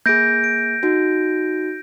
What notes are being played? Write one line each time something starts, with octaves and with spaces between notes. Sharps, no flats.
A#3 G#4 G6 A#6 D7
D7
D#4 F#4